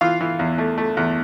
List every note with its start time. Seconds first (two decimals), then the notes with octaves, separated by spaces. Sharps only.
0.01 E3 F4 F5
0.21 E3
0.39 E2
0.58 A3
0.78 A3
0.97 E2